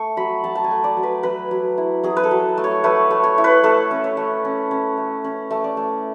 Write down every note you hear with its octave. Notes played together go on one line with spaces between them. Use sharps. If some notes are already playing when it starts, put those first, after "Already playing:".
Already playing: A3 C#6
F#3 B5
F#3 A5
A5
G#5
A3
D5
F#3
B4
F#3 B4
F#3
E4
F#3 G#4
B4
A4
F#3
A3
C#5
A3 B4
A3
C#5
E4
B4
A3 A4
C#4
C#5
A3
C#4
C#4
A3
C#4
A3
D5
A3